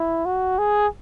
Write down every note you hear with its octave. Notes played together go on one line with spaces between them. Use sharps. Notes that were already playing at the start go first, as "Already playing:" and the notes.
Already playing: E4
F#4
G#4